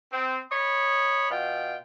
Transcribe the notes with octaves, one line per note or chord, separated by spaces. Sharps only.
C4
C#5 D#5 B5
B2 F4 G5